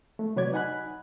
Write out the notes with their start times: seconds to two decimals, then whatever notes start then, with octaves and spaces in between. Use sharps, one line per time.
0.19 A3
0.36 C3 F#3 B4 C#5 D5 G#6
0.53 D#4 F#5 G#5 B5 F#6